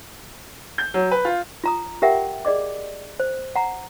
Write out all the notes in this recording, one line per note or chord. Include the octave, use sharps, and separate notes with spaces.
G6
F#3
B4
F4
F4 A#5 D#6
G4 A#4 E5 F#5 G5
G#4 D5 D#5 D6
C5
F#5 A#5